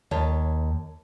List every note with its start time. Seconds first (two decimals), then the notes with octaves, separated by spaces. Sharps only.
0.11 D#2 C#5 A5